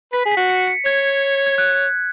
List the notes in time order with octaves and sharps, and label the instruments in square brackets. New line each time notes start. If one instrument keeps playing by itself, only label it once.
[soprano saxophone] B4 [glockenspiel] B6
[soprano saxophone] G#4
[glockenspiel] B6
[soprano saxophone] F#4
[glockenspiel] C#7
C#7
[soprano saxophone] C#5 [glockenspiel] G#6
[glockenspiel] G#6
F#6